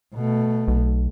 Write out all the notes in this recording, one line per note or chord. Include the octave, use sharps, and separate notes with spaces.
B2 A3
B1